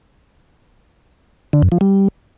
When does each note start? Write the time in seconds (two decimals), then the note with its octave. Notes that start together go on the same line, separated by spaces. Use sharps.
1.53 D3
1.62 F#2
1.72 F3
1.81 G3